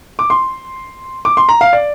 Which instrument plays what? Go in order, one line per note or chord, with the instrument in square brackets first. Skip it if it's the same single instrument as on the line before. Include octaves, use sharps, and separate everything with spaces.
[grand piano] D6
C6
D6
C6
A#5
F5
D5